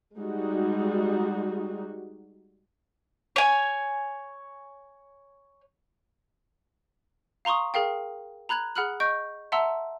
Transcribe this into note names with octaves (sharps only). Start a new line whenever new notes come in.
G3 G#3 D#4 F#4
C#5 G#5
F5 A#5 C6 C#6 D#6
G#4 A#4 F5 G5
A#5 B5 F#6 G#6 F7
G#4 F#5 B5 F6 F#6 F#7
D#5 C#6 G6 D7
E5 F#5 A5 A#5 C6 E6